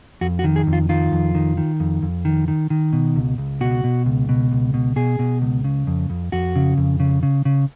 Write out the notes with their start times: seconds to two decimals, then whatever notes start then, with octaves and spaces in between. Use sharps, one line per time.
0.21 F2 F#4
0.39 F#4
0.44 D#3
0.56 G#4
0.67 F2
0.73 F4
0.89 D#3 F4
1.12 F2
1.35 D#3
1.57 D#3
1.80 F2
2.03 F2
2.25 D#3
2.48 D#3
2.70 D#3
2.93 B2
3.16 C#2
3.38 C#2
3.61 B2 F#4
3.84 B2
4.06 C#2
4.29 B2
4.51 C#2
4.74 B2
4.96 B2 G#4
5.19 B2
5.42 C#2
5.64 C#3
5.87 F2
6.10 F2
6.32 F2 F#4
6.56 C#3
6.78 F2
7.00 C#3
7.23 C#3
7.45 C#3